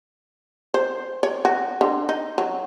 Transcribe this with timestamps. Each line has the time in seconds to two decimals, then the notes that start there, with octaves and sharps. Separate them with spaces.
0.74 C5
1.23 C#5
1.45 F#4
1.81 D3
2.09 D#4
2.38 F#3